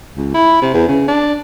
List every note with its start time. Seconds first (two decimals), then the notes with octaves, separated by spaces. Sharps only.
0.17 C#2
0.34 E4
0.62 C3
0.74 E2
0.88 C#3
1.08 D4